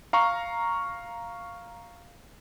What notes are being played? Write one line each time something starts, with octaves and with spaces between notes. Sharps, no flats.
F5 A#5 C#6